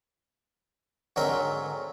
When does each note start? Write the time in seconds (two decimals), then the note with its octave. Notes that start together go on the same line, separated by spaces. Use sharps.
1.16 G#2 D3 F#3 C4 A#4 G5